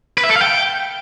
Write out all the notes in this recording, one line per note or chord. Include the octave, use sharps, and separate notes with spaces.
B4
E5
A4
F5
G5